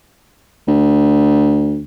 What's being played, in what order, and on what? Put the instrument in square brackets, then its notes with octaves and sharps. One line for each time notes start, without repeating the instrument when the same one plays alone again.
[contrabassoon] D2